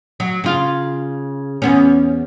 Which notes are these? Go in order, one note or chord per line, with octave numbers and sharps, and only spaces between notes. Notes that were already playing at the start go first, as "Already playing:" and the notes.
F#3
C#3 F4
E2 B3 C#4